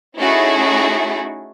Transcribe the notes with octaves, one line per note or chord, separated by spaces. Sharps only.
A3 C#4 D#4 E4 F#4 G#4